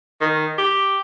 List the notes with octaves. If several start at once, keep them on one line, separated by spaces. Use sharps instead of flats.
D#3
G4